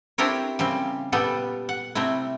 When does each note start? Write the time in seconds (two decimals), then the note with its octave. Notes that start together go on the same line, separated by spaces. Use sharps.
0.18 C4 D4 E4 G4 A#4 C#5
0.59 C#3 G3 A#3 C4
1.12 A#2 G3 B3 G4 A4
1.69 F#5
1.95 C3 G3 A3 C4 E4